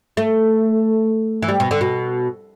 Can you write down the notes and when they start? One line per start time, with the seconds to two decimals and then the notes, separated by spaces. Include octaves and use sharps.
0.17 A3
1.42 E3
1.48 G3
1.60 B2
1.71 D3
1.81 B2